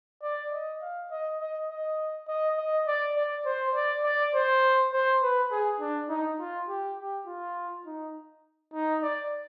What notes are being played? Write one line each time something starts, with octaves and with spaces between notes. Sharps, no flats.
D5
D#5
F5
D#5
D#5
D#5
D#5
D#5
D5
D5
C5
D5
D5
C5
C5
B4
G#4
D4
D#4
F4
G4
G4
F4
D#4
D#4
D5